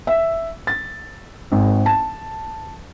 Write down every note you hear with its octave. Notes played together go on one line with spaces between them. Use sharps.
E5
A6
G#1
A5